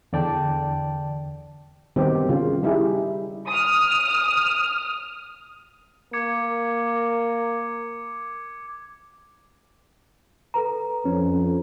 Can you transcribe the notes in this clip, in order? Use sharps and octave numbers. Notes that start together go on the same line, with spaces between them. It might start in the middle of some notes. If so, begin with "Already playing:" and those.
E2 D3 D5 G5 A5
D#3 G3 B3 C4 G4
C#3 G3 F4
G3 D#4 E4 G4 G#4
D#6 F6
A#3 D6 G#6 C#7
A4 B4 A#5
F2 C#4